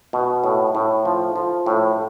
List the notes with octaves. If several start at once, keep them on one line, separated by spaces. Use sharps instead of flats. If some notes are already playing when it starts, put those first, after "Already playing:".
B2
A2
A2
F3
F3
A2